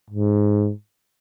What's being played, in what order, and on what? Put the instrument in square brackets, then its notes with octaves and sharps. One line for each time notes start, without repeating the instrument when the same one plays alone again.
[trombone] G#2